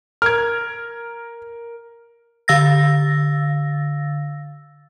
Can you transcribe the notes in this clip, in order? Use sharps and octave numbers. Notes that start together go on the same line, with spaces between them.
A#4 F6 G#6
D3 F5 E6 A6 A#6